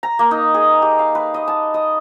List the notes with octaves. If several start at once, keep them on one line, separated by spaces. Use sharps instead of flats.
A#5
A#3
D#4
G#4
G4
F5
B4
D#5
A5
D#5